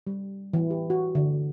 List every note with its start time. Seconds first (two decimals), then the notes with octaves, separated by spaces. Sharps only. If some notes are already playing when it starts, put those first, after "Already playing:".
0.07 G3
0.53 E3
0.70 G4
0.90 F#4
1.15 D3